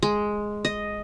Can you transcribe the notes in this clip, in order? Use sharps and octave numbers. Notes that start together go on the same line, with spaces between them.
G#3
D#5